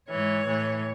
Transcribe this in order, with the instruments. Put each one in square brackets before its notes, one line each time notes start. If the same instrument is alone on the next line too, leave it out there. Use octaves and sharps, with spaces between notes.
[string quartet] G#2 E3 C#5
A2 E3